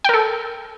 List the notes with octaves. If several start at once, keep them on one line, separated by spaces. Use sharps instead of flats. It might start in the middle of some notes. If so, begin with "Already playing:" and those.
A4 A#4 G5